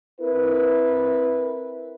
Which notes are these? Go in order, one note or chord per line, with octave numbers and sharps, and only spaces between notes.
C4 E4 A#4 B4